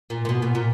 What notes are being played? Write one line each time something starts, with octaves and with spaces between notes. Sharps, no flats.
A#2
A#2
B2
A#2
A#2